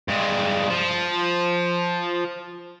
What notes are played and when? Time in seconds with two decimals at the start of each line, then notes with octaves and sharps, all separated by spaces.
0.08 G2 G#3
0.70 F3